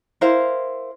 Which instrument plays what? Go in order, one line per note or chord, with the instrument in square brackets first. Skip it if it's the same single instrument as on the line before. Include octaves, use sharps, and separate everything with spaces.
[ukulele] E4 A#4 C5 F5